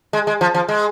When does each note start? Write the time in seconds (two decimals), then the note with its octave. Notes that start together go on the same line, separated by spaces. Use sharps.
0.13 G#3
0.27 G#3
0.41 F3
0.55 F3
0.69 G#3